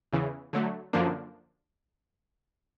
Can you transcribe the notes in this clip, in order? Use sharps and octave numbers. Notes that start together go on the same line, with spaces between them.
E2 C#3 E3
D3 F#3 A3
F#2 D3 F3 A#3 D4